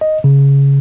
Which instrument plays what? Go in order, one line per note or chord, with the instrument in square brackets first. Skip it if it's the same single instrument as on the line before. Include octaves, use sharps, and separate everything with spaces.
[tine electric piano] D#5
C#3